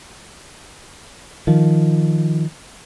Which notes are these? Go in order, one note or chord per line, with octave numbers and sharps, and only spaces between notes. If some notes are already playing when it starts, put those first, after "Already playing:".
D#3 F3